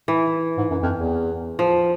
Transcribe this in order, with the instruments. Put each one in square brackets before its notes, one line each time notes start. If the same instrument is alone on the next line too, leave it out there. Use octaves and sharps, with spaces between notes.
[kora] E3
[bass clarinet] G#2
F#2
F2
E2
[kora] F3